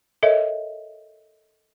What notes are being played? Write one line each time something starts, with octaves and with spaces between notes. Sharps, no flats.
A4 A#4 C#5 D#5 E5